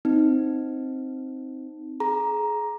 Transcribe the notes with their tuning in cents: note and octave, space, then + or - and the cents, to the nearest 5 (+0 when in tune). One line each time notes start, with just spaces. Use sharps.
C4 +0 D#4 +5
G#4 +30 A#5 +10